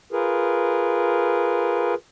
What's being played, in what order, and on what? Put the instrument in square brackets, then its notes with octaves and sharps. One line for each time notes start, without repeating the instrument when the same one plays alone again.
[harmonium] F4 G#4 A#4 B4